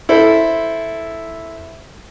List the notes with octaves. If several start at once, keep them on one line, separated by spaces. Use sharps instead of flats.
E4 A4 C5